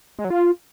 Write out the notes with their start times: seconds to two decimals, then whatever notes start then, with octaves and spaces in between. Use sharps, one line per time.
0.19 G#3
0.25 F#3
0.30 F4